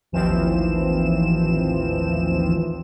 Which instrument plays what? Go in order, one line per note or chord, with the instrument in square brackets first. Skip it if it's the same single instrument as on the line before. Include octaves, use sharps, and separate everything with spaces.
[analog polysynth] A1 D#2 E3 F3 C4 E7